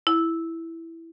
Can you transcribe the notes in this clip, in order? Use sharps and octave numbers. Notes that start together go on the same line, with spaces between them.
E4